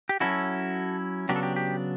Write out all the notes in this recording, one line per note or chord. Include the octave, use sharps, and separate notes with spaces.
G4
F#3 C#4 E4 F#4 A4
C#3 F#3 B3 D4 G4
A4
G4
G4